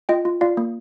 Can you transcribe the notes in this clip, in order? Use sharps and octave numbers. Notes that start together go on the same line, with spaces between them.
F4 D#5 G5
F4
F4 D5 F5
A#3